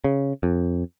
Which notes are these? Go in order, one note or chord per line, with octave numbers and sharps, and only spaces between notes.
C#3
F2